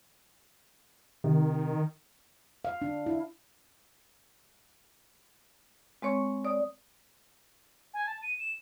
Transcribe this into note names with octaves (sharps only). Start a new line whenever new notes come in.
C3 D#3
F5
D4
E4
G#3 C4 C#5 C#6
C#5 D5 D#6
G#5
A5
D#7
E7